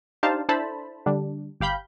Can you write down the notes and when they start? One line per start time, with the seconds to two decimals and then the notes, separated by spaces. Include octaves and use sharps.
0.23 D4 D#4 G4 C5 F5 A5
0.49 D4 E4 A4 C5 A5 B5
1.06 D3 G3 D4
1.60 G1 G4 F5 B5 G6